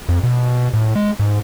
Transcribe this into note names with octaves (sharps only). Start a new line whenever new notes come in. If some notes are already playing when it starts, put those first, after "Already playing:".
F2
B2
A2
G#3
G#2